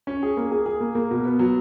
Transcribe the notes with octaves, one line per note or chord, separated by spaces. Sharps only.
C#4
G#4
A#3
G#4
G#4
A#3
A#3
B2
B3
F#3